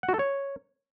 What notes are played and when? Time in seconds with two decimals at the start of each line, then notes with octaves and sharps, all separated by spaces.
0.03 F#5
0.09 F#4
0.14 A4
0.19 C#5